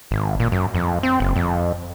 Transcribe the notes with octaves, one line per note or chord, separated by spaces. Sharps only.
G#1
A#2
F#2
F2
C4
F#1
F2